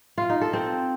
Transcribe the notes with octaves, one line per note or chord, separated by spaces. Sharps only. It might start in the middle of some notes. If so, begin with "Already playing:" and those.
F4
D#4
A4
C4